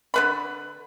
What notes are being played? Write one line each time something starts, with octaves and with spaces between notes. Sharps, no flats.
D3 B4 B5